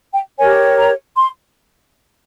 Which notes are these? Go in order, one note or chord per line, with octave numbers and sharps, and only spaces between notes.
G5
G4 A#4 C#5 G#5
A#5
C6